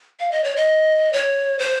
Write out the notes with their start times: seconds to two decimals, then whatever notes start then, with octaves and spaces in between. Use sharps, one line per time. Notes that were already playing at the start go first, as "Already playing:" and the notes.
0.20 F5
0.32 D#5
0.44 C#5
0.56 D#5
1.13 C#5
1.59 C5